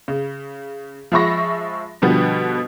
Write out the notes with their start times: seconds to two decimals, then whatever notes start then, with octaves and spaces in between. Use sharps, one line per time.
0.08 C#3
1.12 F3 G#3 E5 B5 C#6 A#6
2.02 B2 D3 F3 G3 B3